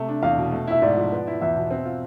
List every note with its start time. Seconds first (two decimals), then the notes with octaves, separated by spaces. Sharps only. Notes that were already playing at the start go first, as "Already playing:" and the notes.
Already playing: C3 A3
0.08 D4
0.23 E2 F5
0.38 B2
0.52 A3
0.67 E4 E5
0.82 G#2 D5
0.97 F3
1.12 B3
1.27 E4
1.42 E2 E5
1.56 B2
1.71 C4
1.86 F4